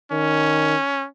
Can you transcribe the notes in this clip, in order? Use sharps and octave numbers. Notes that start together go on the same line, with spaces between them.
D#3 C#4